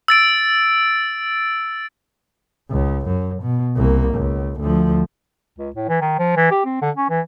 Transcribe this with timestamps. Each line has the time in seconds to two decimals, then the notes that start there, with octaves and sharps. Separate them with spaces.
0.08 E6 A6 D7
2.70 C#2
3.06 F#2
3.42 B2
3.76 C2 A#3
4.14 C#2
4.60 D2 F3
5.58 C#2
5.76 A2
5.89 E3
6.01 D#3
6.19 F3
6.37 E3
6.51 G4
6.65 C4
6.82 D3
6.96 C#4
7.10 E3